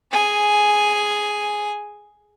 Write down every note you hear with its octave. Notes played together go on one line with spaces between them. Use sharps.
G#4 G#5